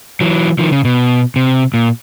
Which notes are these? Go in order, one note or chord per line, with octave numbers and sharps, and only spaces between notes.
E3 F#3
D#3 F3
C#3
B2
C3
A#2